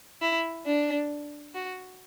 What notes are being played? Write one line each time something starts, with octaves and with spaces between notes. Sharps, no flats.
E4
D4
F#4